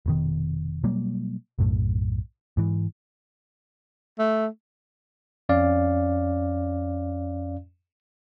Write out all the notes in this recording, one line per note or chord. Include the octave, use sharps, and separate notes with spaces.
F1 B2 D#3
B2 F#3 G3 A#3
B1 F#2 A2
G#2 E3
A3
F2 C#4 D5 F5